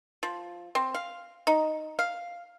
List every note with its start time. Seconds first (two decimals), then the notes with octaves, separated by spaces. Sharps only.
0.23 F3
0.75 C4
0.94 F5
1.47 D#4
1.99 F5